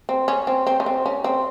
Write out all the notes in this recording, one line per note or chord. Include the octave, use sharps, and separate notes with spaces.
C4
C#4
C4
C4
C#4
C4
C#4
C4